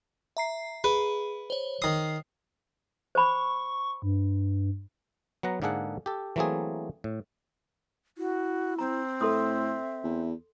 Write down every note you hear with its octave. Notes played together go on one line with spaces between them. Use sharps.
E5 A#5 C7
G#4 B4
C5 C#5
D#3 D#6 C7
C5 B5 C#6
G2
F#3 B3 F#5 A#5
G#2 D3 A#3 G#4 A4 F#5
G4 A4
E3 F#3 A3 A#3 C4 G#4
A2
E4 F#4
C4 A#5
A2 A4 E5 C6 D#6
E2